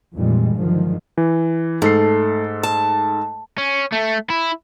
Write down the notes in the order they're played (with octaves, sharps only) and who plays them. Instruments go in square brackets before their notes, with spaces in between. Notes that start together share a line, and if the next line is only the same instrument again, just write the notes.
[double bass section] F2 A#2 D#3 E3 G3 G#3
G2 D3 D#3 F3 F#3 G#3
[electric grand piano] E3
[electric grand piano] G#2 A4 C7 [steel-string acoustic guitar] A3
[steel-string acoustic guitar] A5
[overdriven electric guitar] C#4
A3
E4